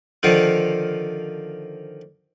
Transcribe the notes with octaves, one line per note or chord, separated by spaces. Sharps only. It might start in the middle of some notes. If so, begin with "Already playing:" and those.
D3 D#3 F3 F4